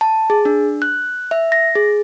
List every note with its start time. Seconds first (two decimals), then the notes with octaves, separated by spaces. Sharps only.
0.01 A5
0.30 G#4
0.45 D4
0.82 F#6
1.31 E5
1.52 A#6
1.75 G#4